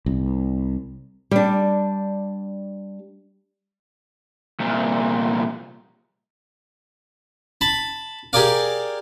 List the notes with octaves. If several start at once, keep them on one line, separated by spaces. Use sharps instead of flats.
C2
G3 D4
C2 A#2
A5 B5
G4 G#4 A#4 D5 F5